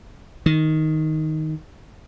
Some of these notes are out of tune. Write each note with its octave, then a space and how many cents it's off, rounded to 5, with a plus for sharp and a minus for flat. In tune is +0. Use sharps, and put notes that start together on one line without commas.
D#3 +5